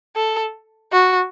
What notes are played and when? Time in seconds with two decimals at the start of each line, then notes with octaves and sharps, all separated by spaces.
0.16 A4
0.92 F#4